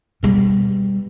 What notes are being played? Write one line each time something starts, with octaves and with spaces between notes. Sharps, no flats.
B2 G3